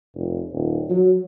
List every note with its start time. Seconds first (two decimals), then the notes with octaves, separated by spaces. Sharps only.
0.15 F1
0.52 D#1
0.89 F#3